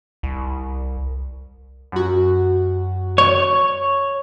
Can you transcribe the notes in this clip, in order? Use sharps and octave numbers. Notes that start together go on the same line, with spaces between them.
C2
F#2 F#4
C#5